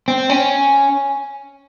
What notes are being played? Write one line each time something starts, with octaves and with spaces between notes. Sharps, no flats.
C4
C#4